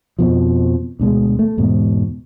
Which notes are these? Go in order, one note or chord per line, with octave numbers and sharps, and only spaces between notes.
F2 B2 F3
D2 B2 G#3
A3
E2 G#2 B2